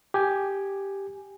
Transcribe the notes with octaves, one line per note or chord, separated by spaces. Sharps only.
G4 G#5